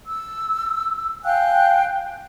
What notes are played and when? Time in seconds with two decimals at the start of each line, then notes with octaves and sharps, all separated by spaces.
0.06 E6
1.24 F5 G5 G#5 F#6